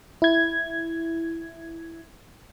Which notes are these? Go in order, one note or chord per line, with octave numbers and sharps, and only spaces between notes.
E4 G#6